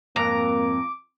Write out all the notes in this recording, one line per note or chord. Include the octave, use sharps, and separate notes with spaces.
F2 G#2 A#3 A#5 D6